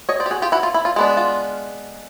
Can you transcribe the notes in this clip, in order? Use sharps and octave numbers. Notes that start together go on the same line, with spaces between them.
C#5 D#5
C5 D5
G4
F#4 G#4
F4 G4
E4 F#4
F4
E4
F4
G#3 B3 D4
F4